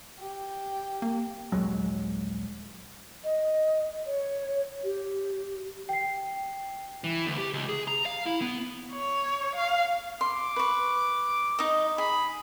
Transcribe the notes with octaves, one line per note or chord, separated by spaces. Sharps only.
G4
A#3
A#1 D#2 F#3 G#3
D#5
C#5
G4
G5 C7
E3
D2
G4
C#2
G#4
A#5
F5
E4
B3
C#5
F5
C6 D6
B4 C#6
D#4 D#5
G#4 B5